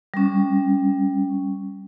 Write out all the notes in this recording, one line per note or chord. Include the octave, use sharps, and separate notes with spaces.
G3 C#4